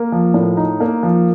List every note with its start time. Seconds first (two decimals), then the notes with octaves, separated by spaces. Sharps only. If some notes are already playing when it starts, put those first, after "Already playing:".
Already playing: A#3
0.12 F3
0.34 A2
0.57 D#4
0.80 A#3
1.03 F3